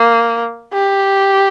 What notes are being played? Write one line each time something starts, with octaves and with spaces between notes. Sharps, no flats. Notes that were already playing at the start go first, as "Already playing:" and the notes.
Already playing: A#3
G4